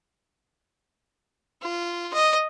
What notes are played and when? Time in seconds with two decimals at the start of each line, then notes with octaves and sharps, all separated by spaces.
1.62 F4
2.14 D#5